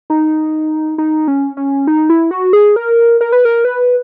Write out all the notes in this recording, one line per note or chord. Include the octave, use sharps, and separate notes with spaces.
D#4
D#4
C#4
C#4
D#4
E4
F#4
G#4
A#4
A#4
B4
A#4
B4